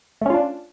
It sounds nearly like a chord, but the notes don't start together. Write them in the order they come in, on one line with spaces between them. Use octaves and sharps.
A3 C#4 F4 D4